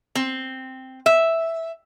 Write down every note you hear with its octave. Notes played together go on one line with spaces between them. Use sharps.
C4
E5